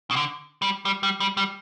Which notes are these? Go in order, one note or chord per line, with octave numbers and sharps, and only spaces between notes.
B2
D3
G3
G3
G3
G3
G3